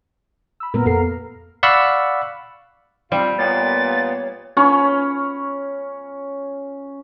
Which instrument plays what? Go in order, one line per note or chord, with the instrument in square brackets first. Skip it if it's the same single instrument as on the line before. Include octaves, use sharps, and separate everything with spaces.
[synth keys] B5 E6
[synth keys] A#2 [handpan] A#3 B3 A#4
[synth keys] F2 A4 C7 [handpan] A#4
[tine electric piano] D5 F5 F#5 B5 C#6 E6
[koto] G3 [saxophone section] C4 F4
[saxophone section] A#2 A#3 B3 [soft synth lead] C#5 [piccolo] A6
[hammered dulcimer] C#4 C#5 B5